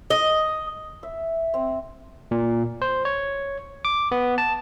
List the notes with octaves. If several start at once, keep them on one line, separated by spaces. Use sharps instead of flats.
D#5
E5
C4
A#2
C5
C#5
D6
B3
A5